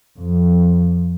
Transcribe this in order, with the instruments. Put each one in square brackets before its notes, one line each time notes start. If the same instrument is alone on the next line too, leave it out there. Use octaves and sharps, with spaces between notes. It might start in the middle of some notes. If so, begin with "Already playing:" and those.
[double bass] F2